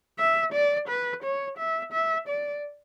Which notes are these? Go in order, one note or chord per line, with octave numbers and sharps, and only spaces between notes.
E5
D5
B4
C#5
E5
E5
D5